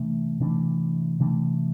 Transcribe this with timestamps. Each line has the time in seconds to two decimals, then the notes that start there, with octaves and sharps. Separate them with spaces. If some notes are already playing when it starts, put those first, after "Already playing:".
Already playing: C3 E3 A3 D4
0.40 C3 E3 A3 D4
1.20 C3 E3 A3 D4